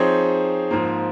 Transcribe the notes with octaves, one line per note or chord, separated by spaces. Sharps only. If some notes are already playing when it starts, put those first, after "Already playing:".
Already playing: F3 C4 D#4 G#4 C#5
G#2 F3 A#3